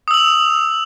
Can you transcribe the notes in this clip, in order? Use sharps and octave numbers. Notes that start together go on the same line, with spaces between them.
D#6 E6 F7 F#7